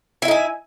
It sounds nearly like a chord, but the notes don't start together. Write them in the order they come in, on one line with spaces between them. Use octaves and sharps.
E4 E5 D#4 G#5